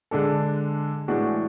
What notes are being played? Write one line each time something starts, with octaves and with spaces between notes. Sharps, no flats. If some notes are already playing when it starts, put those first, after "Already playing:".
D3 G#3 D4 A4
A2 E3 G#3 D4 F#4